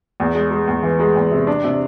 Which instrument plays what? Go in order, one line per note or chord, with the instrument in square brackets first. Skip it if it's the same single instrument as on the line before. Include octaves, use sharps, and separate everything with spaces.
[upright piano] E2
G#3
G#3
E2
E3
G#3
E2
C3
D4
C3